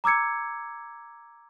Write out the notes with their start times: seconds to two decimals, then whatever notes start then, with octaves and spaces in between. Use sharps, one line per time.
0.04 A#5 D6 E6 G#6 C#7